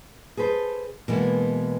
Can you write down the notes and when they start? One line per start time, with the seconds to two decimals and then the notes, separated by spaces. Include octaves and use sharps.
0.37 G#4 A4 B4 C5
1.08 B2 E3 G#3 A#3 B3